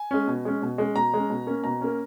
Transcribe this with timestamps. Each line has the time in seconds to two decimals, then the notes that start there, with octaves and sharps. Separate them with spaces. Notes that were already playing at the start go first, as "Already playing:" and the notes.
Already playing: G#5
0.11 G#3 C#4
0.28 B2
0.45 G#3 C#4
0.62 B2
0.78 G#3 C#4
0.95 B2 A#5
1.14 G#3 C#4
1.30 B2
1.47 A#3 C#4
1.64 B2 A#5
1.81 A#3 C#4